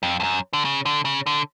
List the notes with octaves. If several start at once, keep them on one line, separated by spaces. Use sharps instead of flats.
F2
F2
F#2
D3
C#3
D3
C#3
D3